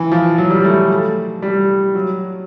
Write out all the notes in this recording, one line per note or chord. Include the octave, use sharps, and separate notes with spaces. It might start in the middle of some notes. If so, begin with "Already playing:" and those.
Already playing: E3
F3
F#3
G3
A3
G3
F#3